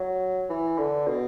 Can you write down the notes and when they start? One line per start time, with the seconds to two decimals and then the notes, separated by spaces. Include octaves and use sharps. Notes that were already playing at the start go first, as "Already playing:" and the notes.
Already playing: F#3
0.49 E3
0.78 D3
1.07 B2